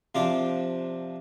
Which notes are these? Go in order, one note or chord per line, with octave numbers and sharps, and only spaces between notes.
C3 F3 D4 F4 D6